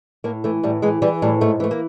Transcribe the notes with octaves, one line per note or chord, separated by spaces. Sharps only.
A2 A#3
E3 A3
A2 G3
E3 G#3
E3 G3
A2 G3
G#2 A3
E3 A3
A#3